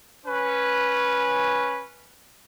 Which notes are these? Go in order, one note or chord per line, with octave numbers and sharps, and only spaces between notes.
C#4 B4